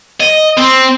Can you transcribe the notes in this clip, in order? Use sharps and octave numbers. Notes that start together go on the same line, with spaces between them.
D#5
C4